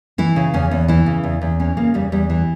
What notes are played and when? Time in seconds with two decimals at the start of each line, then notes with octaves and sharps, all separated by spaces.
0.18 E3 E4
0.36 C#3
0.54 E2 C#4
0.71 E2
0.88 E3 E4
1.06 C#3
1.24 E2
1.42 E2
1.60 E3 C#4
1.77 C#3 A#3
1.94 E2 G3
2.12 E2 G3
2.30 E3